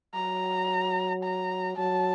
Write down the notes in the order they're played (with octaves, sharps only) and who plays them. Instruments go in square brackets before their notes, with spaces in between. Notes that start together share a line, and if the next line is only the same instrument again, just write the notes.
[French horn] F#3 [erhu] A#5
[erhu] A#5
[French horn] F#3 [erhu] A5